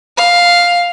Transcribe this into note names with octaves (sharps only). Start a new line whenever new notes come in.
F5